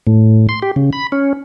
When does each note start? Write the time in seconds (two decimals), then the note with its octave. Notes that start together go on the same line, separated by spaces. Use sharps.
0.07 A2
0.49 C6
0.62 G4
0.76 C#3
0.93 B5
1.12 C#4